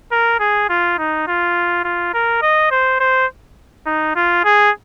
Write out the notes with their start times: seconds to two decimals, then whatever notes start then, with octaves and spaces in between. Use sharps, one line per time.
0.12 A#4
0.40 G#4
0.69 F4
0.98 D#4
1.27 F4
1.84 F4
2.14 A#4
2.42 D#5
2.71 C5
3.00 C5
3.86 D#4
4.16 F4
4.44 G#4